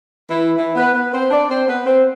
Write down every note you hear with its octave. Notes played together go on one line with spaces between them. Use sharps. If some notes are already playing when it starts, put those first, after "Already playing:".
E3 E4
E3 E4
B3 B4
B3 B4
C4 C5
D4 D5
C4 C5
B3 B4
C4 C5